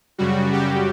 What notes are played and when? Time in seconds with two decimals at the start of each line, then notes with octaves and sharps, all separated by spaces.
0.18 F#2 C#3 G3 F#4
0.53 G4